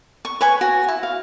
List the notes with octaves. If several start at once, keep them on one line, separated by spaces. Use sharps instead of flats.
C#6
B4 C#5 G#5 C#6
F#4
E4
F5